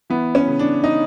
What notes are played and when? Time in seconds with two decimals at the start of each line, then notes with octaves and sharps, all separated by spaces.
0.10 E3 B3
0.35 C#4
0.47 C#3
0.59 D4
0.84 D#4